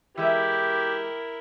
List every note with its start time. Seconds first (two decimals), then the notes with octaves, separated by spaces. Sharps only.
0.17 E3 G#3 E4 G4 A#4 E5